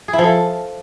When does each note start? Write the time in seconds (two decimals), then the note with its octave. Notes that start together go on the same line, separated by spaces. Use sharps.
0.08 G#4
0.13 E4
0.18 F3
0.24 A4